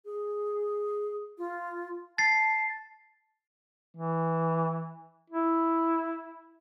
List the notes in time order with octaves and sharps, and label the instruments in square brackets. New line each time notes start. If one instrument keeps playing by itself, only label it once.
[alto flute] G#4
F4
[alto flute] A5 [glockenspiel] A6 C7
[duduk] E3
E4